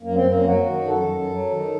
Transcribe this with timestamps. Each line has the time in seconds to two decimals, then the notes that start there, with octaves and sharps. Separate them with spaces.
0.03 F#2 A#3
0.15 C4
0.24 F#2 A#3
0.44 F#3 F#4
0.66 D#3
0.87 F#2 A4
1.08 F#2
1.29 F#3
1.52 D#3